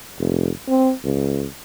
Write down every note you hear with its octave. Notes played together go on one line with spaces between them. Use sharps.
F1
C4
C#2